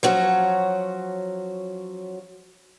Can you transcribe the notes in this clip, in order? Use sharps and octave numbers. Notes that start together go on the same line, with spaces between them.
F3 F#3 C#4 F#4